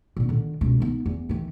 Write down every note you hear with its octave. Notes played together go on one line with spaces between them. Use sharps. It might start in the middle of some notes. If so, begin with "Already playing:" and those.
A#2 B3
D3 D#3
C#2 B2
B3 D#4
E2
D#3 E3